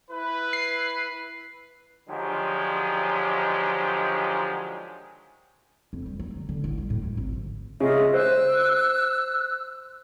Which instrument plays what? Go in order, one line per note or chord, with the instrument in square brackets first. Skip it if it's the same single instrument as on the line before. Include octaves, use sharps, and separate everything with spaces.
[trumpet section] E4 B4
[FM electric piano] C7
[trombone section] D3 D#3 F3 F#3 G#3 G4
[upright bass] F2
G3
F#3
D3
D3
A1
G3
A2
F#2
G#1
D2
[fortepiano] C#3 [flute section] F4 D#5 E5
[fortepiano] C5 [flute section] E6 F#6